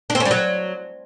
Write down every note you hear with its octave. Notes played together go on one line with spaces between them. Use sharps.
D4
C4
C#4
G3
F#3